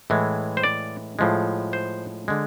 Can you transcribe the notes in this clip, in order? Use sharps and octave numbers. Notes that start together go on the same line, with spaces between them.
A2 E3 G#3
C5
D5
A2 F3 G#3
C5
D3 G#3